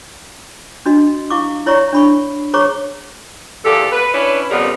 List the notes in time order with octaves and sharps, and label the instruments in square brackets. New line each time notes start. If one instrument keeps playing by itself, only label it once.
[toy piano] D4 F#4 D#5
E4 F5 C#6 D6
E4 C#5 D5 E5 A#5 C#6
D4 B5 C#6
G#4 C5 C#5 A#5 C#6 D6
[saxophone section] E2 A#2 G4 A4
B4
C#4 D4 E4 B4 C#5
F2 C#3 G3 B3 A#4